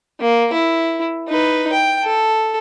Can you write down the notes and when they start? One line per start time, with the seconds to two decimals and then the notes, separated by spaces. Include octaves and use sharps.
0.20 A#3
0.53 E4
1.28 D#4 B4
1.73 G5
2.03 A4